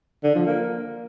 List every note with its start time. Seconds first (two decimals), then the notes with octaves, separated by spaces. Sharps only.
0.24 D3
0.35 F3
0.46 A#3